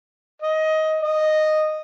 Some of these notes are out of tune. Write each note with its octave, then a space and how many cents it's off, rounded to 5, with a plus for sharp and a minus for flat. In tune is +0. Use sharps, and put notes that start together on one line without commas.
D#5 +15
D#5 -10